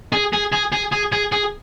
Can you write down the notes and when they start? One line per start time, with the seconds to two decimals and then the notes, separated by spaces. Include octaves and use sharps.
0.13 G#4
0.33 G#4
0.53 G#4
0.73 G#4
0.92 G#4
1.12 G#4
1.32 G#4